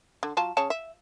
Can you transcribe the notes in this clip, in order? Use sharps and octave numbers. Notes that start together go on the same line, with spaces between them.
D3
F#3 F4 A5
C#3 C#5 A5
E5